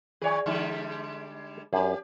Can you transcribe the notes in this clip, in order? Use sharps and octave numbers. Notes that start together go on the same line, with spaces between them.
D#3 G#4 C#5 D5
D3 G3 G#3
F#2 C#4 G4